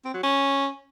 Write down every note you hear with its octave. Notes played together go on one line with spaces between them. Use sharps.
C4
F#3
C#4